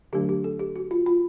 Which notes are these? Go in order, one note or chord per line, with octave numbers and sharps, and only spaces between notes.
D3 F#3 A3 D4 G4
G4
A4
G4
F#4
F4
F4